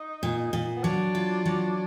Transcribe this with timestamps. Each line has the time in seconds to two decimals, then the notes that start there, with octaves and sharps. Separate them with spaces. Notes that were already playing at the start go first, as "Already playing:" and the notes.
Already playing: D#4
0.23 A#2
0.53 A#2
0.76 B3
0.83 F#3 D4
1.15 F4
1.45 F#3